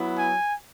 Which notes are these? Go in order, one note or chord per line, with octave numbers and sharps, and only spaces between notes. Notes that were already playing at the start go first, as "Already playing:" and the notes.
Already playing: F#3 B3 E4
G#5